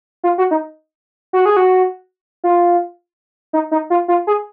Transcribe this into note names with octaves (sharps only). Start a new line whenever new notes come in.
F4
F#4
D#4
F#4
G#4
F#4
F4
D#4
D#4
F4
F4
G#4